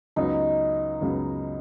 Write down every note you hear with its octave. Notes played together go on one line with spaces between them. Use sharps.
C#2 C#3 F#3 B3 D#4
C#2 C#3 F#3 B3